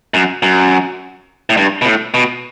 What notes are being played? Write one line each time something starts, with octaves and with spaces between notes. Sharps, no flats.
F#2
F#2
A2
G2
B2
A2
B2